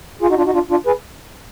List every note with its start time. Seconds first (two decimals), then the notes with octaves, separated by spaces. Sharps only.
0.21 F4 G#4
0.30 D#4 F#4
0.37 D4 F4
0.46 D#4 F#4
0.54 D4 F4
0.70 D4 F4
0.87 G#4 B4